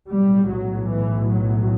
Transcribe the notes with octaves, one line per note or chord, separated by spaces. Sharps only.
B1 A2 G3
F#3
E3
F#3